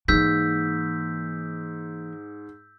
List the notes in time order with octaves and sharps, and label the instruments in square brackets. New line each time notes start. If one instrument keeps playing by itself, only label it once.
[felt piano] G#2 [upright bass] E3 A#3 [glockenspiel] E6 G6 B6